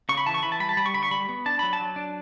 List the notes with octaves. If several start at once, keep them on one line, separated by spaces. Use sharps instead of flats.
C#3 C#6
B5
E3 A5
C#6
E3 B5
A5
G3 B5
A5
G3 B5
C#6
D3 B5
C#6
G3 B5
B3
D4 A5
F#3 B5
A5
F#3
D4